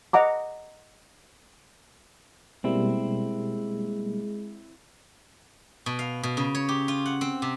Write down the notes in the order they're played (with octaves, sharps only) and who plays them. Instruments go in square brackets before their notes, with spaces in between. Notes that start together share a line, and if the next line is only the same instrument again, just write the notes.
[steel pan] D#5 F#5 A#5 D6
[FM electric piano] B2 G3 A#3 [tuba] G#3 [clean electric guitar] C4 E4
[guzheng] B2
F5
B2
C#3
C#5
G4
F4
F#5
C4
C3